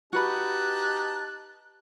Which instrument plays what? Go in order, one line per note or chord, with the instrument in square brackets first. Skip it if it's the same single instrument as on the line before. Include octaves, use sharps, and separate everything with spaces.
[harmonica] D#4 A5 [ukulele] F#4 B4 B5 [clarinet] G4 [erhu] F#6